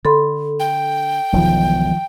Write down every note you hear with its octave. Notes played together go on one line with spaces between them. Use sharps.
D3 A4 B5 C6
G5
E1 B1 E2 D#3 F3